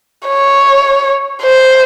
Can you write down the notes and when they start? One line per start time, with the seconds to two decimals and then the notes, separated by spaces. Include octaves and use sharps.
0.28 C#5
1.43 C5